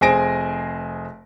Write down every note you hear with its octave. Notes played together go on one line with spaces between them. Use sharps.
F1 C4 G#4 G#5 A#6 D7